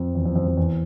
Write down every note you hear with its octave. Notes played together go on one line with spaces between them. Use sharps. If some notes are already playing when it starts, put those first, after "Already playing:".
Already playing: F2
E2
F2
F2
F2
E2